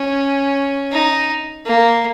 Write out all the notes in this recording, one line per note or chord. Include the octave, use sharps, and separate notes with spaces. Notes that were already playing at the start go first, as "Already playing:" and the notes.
Already playing: C#4
D#4
A#3